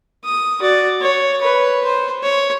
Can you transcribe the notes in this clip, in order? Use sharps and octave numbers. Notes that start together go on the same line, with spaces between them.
D#6
F#4 D5
C#5
B4 C#5
C5
C#5